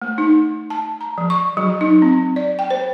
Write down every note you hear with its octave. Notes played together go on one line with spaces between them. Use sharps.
A3
D#4
A5
A#5
F3
C#6
F#3
D#4
C4
D5
G5
C5